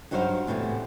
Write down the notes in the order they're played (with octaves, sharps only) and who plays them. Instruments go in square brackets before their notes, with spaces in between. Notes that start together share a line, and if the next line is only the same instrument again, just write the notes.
[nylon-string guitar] G2 F#3 D#4 F#4 C5 F5
E2 A2 C3 D#3 E3